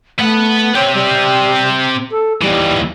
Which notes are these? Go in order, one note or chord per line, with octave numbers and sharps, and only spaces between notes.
A3 B3 F#5
C4 G4 C#5
G3
A4
D#2 E3 G3